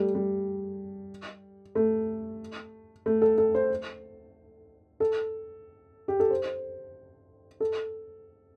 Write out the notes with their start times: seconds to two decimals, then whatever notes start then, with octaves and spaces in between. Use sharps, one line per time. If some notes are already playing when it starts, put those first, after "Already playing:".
Already playing: G3 A3
0.15 G3
1.75 A3
3.06 A3
3.22 A4
3.38 A4
3.55 C5
5.00 A4
6.08 G4
6.20 A4
6.31 C5
7.60 A4